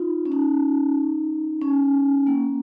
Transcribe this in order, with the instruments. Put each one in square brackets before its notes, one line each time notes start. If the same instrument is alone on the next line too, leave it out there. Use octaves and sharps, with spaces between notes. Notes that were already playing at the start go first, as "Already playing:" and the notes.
Already playing: [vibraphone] D#4 F4
C#4
D#4
C#4
A#3